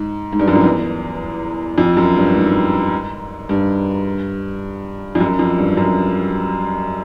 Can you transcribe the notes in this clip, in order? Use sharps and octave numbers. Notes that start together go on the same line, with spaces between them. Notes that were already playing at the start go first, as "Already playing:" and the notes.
Already playing: G#2
G#2
G2
F#2
F2
E2
F2
F#2
G2
G#2
G2
F2
F#2
F2
G2
F#2